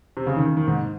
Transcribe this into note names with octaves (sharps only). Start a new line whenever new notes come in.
C3
C#3
D#3
D#3
G#2